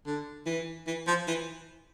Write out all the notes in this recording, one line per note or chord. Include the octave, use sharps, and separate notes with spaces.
D3
E3
E3
F3
E3